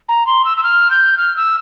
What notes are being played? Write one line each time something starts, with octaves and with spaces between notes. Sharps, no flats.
A#5
C6
E6
E6
F6
G6
F6
E6